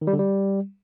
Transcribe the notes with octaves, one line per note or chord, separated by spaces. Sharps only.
D#3
G3
D3
G3